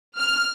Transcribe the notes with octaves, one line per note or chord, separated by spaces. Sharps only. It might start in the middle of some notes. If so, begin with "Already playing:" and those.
F6